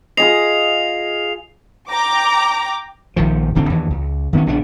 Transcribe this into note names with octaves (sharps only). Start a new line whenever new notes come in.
F4 G#4 D#5 C7 F7
G5 A#5 D6
A#1 D#3 F3
D1 D3 C4
D#2 D3 E3
C#2
D#3 B3 C#4
A#1 C#3 B3 D4